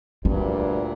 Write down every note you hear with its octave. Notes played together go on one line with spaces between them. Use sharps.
D2 G2 A#2 F4